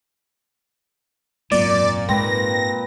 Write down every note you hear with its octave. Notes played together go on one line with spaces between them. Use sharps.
G#1 F#2 A#2 D5
G#2 C4 B4 A#6